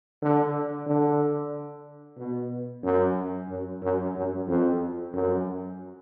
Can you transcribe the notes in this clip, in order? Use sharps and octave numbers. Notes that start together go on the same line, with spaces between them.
D3
D3
B2
F#2
F#2
F#2
F#2
F2
F#2